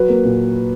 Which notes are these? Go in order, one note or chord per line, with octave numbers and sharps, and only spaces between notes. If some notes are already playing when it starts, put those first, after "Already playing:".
Already playing: F#3 B4
A#3
A#2